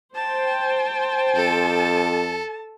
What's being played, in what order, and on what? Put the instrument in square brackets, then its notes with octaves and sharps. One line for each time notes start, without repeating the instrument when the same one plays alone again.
[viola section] C5 G5 [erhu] A5
[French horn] F2 [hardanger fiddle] A4